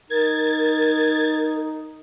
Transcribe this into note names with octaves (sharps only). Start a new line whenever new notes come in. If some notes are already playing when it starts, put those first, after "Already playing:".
D#4 A#4 G#6 A6